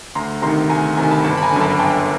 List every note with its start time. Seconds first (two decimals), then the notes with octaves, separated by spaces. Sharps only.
0.15 D2 A#5 C6
0.42 C3 D#3 A#5 C6
0.69 D2 G#5 A#5
0.97 C3 D#3 G#5 A#5
1.11 A5 B5
1.24 G1 A5 B5
1.37 B5
1.43 G#5 A#5
1.52 F#2 D3
1.61 A5 B5
1.79 G1 G5 A5